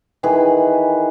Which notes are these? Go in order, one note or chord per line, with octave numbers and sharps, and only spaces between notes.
D#3 E3 G#4 B4